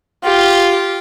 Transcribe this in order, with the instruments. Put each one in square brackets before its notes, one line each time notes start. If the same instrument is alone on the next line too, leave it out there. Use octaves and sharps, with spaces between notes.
[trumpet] F4 [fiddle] G4